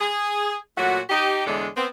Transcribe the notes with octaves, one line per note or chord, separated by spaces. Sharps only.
G#4
A#2 F#3 A3 F#4
D#4 G4
E2 A2 D3 G#3 D4
B3 C4